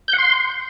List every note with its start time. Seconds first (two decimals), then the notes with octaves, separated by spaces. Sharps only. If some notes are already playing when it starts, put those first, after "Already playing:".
0.08 G6
0.13 F#5
0.18 C6